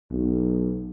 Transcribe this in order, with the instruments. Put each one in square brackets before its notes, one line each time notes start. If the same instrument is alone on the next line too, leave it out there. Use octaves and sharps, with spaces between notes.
[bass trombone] B1